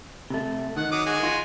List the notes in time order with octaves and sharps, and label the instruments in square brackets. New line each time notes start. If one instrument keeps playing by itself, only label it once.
[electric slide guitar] C3 A3
[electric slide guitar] D#3 [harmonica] F#5
[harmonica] F#3 D6 D#6
G#3 F#4 G#5
[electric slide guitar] F4